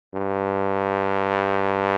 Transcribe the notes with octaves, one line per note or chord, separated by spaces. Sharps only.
G2